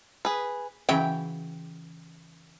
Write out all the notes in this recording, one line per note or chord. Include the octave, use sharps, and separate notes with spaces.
G#4 B4
C#3 E3 F#3 G5